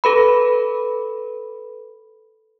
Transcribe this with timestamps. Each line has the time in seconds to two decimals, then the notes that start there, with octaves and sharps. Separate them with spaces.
0.04 A4 B4 B5